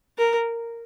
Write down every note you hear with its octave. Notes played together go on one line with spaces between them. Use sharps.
A#4